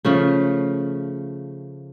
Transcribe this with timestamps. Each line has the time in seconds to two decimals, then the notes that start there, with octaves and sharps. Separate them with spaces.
0.05 C#3 F3 A3